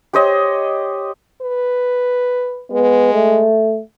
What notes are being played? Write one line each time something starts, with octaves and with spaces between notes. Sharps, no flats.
G4 C5 C#5 D#5
B4
G#3 B3
A3